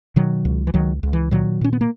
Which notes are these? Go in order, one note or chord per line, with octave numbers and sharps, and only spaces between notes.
B2 D#3 F#3
C#2
E3
C#2 D#3 F#3
C#2
E3
A#2 D#3 F#3
A#2 C#4
B3
A#3